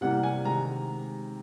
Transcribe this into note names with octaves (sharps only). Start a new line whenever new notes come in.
C3 E3 G3 A#3 F#5
G#5
C3 D#3 G#3 A#5